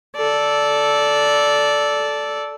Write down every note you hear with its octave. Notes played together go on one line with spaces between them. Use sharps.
A4 D5